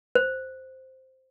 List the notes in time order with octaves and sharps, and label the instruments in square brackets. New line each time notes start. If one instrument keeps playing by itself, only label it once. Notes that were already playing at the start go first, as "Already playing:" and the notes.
[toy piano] C5